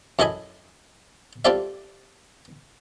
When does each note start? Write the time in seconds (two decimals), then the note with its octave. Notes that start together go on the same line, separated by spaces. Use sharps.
0.19 F#2 E4 A4 D#5 G#5 B5
1.45 G3 C4 F4 A4 D5 E5